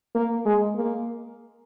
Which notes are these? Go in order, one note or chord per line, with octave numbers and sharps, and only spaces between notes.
A#3
G#3
A#3